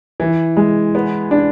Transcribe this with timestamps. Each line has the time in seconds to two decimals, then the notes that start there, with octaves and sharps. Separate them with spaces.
0.20 E3
0.57 G#3
0.95 B3
1.31 D4